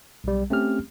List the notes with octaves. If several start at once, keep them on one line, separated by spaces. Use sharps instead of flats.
B1 G3
A3 C4 C#4 G4 F6